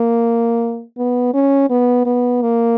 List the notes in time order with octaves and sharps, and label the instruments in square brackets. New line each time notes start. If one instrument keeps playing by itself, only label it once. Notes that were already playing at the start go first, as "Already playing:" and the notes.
Already playing: [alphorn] A#3
B3
C#4
B3
B3
A#3